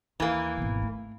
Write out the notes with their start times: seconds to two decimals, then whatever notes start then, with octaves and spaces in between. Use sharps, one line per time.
0.20 D#2 E3 A#3
0.58 G#1 B2
0.82 A3